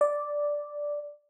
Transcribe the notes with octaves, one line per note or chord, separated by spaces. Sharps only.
D5